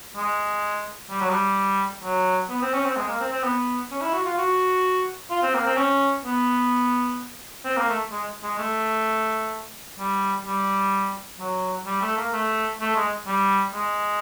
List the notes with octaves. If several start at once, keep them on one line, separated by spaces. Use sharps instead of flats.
G#3
G3
F#3
G3
F#3
B3
C4
C#4
C4
G#3
A#3
C4
C4
B3
C#4
E4
F#4
F4
F#4
F4
C4
A#3
C4
C#4
B3
C4
A#3
A3
G#3
G#3
A3
G3
G3
F#3
G3
A3
A#3
A3
A3
G#3
G3
G#3